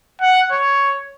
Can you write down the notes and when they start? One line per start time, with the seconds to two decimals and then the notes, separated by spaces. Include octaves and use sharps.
0.22 F#5
0.51 C#5